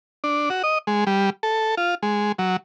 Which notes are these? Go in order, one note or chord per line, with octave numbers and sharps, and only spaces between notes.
D4
F#4
D#5
G#3
G3
A4
F4
G#3
F#3